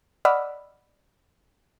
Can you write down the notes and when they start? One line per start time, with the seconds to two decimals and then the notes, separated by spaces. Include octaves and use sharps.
0.25 D5 D#5 F#5 B5 E6 F6